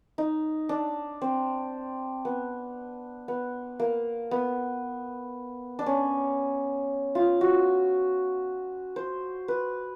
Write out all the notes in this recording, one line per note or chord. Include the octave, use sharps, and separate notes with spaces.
D#4
D4
C4
B3
B3
A#3
B3
D4
C#4
F4
F#4
C5
B4